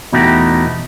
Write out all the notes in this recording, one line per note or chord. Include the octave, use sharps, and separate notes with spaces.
E2 B2 A3 B3 D#4 G4